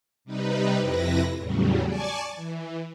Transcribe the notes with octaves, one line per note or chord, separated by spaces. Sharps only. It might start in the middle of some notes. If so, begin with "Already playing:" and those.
C3 G3 D#4 B4
F2 C3 E4 B4 A#6
E2 A2 C#3 F#3 G3
D5 G#5 A5 C#6 D6
E3